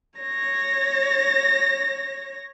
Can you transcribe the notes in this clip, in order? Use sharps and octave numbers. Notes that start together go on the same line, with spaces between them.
C#5 A#6